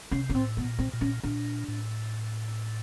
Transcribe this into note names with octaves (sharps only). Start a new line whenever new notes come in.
C3 C#4
C#4
A2 C4
B3
A#2
C4
A#2
C#4
A#2 D4
A2